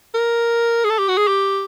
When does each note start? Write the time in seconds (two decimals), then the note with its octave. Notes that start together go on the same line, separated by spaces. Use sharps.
0.14 A#4
0.84 G#4
0.90 A4
0.99 G4
1.08 F#4
1.17 G#4
1.27 G4